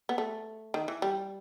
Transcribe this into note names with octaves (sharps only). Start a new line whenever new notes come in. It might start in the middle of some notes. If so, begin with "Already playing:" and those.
B3
A3
D#3
E3
G3